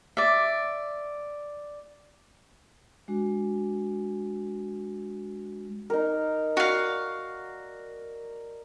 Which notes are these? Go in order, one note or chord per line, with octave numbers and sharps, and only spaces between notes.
D5 E5
G#3 D4 F#4
D#4 A#4
F#4 D5 F5